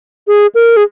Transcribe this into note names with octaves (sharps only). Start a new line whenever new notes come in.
G#4
A#4
G#4